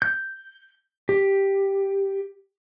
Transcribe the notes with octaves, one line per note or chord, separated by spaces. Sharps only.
G6
G4